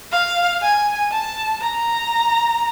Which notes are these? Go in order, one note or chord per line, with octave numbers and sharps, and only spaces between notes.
F5
G#5
A5
A#5